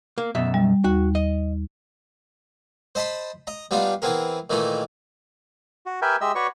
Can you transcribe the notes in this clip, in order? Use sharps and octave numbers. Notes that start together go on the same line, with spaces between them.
A#3
F#2 B2 E5
G3
D#2 F#4
D#5
C5 D#5 A5 B5 C6
D#5 A#5
G3 B3 D4 D#4 F4
E3 B3 C4 G#4 A#4
A#2 D#3 E3 A3 D#4
F#4
G4 A#4 B4 E5 G5 G#5
G#3 G4 D#5 E5 E6
F#4 B4 C#5 D5 C#6